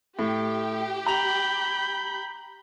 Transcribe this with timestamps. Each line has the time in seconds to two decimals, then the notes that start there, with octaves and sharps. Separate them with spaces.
0.19 A2 G4
1.06 A#5 B5 G6 F7